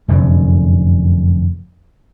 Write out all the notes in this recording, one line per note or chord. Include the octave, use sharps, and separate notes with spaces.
F1 F#2 D3